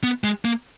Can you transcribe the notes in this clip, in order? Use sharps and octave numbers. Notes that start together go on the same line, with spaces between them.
B3
G#3
A#3